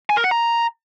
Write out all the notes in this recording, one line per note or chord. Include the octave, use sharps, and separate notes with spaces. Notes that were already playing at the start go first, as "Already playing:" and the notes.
G#5
A#4
F#5
A#5